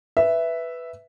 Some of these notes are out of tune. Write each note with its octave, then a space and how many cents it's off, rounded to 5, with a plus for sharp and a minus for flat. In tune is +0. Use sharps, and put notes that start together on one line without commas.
B4 +5 E5 +0